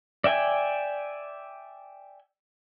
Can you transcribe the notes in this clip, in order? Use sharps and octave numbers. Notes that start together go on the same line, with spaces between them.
D5 E5 G5 G#5